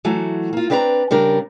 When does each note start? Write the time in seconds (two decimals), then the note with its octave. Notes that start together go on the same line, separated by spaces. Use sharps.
0.05 E3 F#3 A3 F#4
0.53 A#3 F4
0.70 C4 D4 B4 D5 F5 A#5
1.11 C#3 G3 D4 A#4